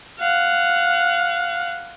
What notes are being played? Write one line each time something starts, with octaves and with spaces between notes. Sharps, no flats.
F5 F#5